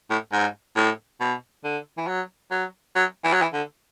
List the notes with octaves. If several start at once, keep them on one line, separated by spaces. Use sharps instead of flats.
A2
G#2
A2
B2
D3
E3
F#3
F#3
F#3
E3
F#3
E3
D3